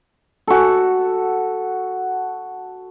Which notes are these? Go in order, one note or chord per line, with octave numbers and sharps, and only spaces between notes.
F#4 A4